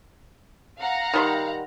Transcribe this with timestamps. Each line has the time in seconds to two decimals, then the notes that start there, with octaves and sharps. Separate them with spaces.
0.79 F5 F#5 A#5
1.13 D#3 G3 C6